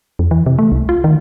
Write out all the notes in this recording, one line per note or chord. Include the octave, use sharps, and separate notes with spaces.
F2
E3
C3
A3
C2
F4
D#3